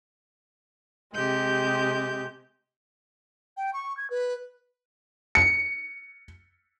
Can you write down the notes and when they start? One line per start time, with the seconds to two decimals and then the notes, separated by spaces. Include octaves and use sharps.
1.14 C3 G#3 G4 G6
3.57 G5
3.74 C#6
3.97 G#6
4.10 B4
5.35 C#7